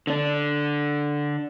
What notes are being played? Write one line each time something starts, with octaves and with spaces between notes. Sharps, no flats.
D3 D4